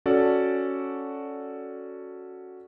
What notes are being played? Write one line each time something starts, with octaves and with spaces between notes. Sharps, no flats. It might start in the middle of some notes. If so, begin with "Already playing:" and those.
C#4 F#4 A4 D5